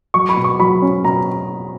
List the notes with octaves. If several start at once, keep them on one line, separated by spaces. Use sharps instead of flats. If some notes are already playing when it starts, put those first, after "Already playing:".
F#3 C#6
B5
B2
C#6
F#3 B5
C#4
B2 A#5